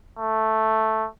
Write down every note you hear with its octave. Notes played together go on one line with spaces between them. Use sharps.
A3